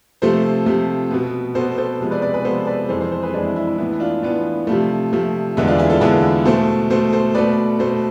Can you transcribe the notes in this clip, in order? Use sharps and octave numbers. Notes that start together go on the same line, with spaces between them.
C3 F3 A3 A4 C5
C3 F3 A3
B2 B3
B2 B3 A4 C5
A4 C5
C3 F3 G#3 B3
B4 D5
B4 D5
G#4 B4
C3 F3 G#3 B3 A4 C5
B4 D5
F2 E3 G#3 A4 C5
A4 C5
A4 C5
G#4 B4
F2 E3 G#3 D4
E4
E4
E4
A2 E3 B3 E4
D4 F4
A2 E3 B3 D4 F4
C3 F3 A3
C3 F3 A3
E2 D3 G#3 B3 E4
D4 F4
E4 G#4
F4 A4
E2 D3 G#3 B3 E4 G#4
B2 A3 A4 C5
B2 A3 A4 C5
A4 C5
B2 A3 B4 D5
B2 A3 A4 C5